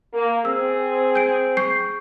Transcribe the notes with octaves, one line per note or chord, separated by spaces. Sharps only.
A#3
C4 G#4 E6
G6 D7
C#6 G6 C7